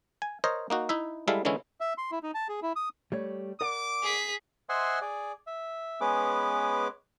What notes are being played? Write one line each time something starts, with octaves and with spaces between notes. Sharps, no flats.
G#5
A#4 C5 C#5 D#5
A#3 D#4 F#4
D#4 E4 E5
G3 G#3 E4 A4 E5 F5
D3 E3 G#3 C#4 E4
E5
C6
E4
D#4
A5
G#4
E4
D#6
G3 A3 C#5
A#4 D5 F#5 D6
G#4 B6
C5 D#5 E5 F#5 G#5 C6
G#4 D5
E5
G#3 B3 C#4 G#4 B4 D6